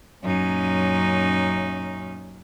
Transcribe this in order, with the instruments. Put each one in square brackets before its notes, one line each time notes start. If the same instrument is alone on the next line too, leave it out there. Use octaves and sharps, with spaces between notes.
[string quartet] F#2 A#2 C#4 D#4